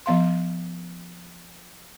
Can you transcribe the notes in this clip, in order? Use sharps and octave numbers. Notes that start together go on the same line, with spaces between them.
F3 B3 F5 C6